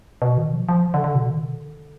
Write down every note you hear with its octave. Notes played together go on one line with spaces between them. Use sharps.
B2
D#3
F3
F3
D3
D3
B2
D#3
D3